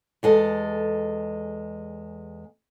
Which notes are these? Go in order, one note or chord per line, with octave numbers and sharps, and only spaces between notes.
E2 G#3 A4